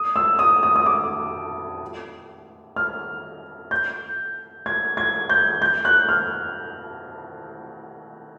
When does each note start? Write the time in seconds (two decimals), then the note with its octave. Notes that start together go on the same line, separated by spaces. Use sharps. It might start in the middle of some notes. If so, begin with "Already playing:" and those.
Already playing: D#6
0.16 E6
0.39 D#6
0.63 D#6
0.76 D#6
0.86 D6
2.76 F6
3.71 G6
4.66 G#6
4.97 G#6
5.30 G6
5.62 G6
5.85 F#6
6.09 F6